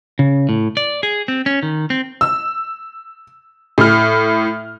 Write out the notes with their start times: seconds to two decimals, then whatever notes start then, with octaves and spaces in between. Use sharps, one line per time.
0.19 C#3
0.49 A2
0.77 D5
1.03 G#4
1.28 C4
1.46 C#4
1.63 D#3
1.90 C4
2.21 E6
3.78 A2 F6